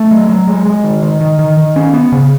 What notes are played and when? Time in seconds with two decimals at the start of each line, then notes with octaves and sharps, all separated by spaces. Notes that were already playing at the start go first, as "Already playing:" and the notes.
Already playing: A3
0.11 F#3
0.29 F#3
0.47 G#3
0.65 G#3
0.84 D#3
1.03 D#3
1.21 D#3
1.39 D#3
1.57 D#3
1.76 C#4
1.94 B3
2.12 C#3